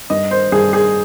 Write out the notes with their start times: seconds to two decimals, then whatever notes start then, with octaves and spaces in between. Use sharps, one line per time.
0.10 G2 D#5
0.31 C5
0.52 G2 G#4
0.73 G#4